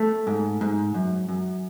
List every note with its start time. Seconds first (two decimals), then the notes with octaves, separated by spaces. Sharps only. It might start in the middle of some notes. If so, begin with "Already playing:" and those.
Already playing: A3
0.27 G#2
0.61 G#2
0.94 F#2
1.29 F#2